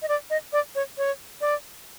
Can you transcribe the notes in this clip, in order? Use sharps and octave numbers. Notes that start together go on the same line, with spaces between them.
D#5
D5
D#5
D5
C#5
C#5
D5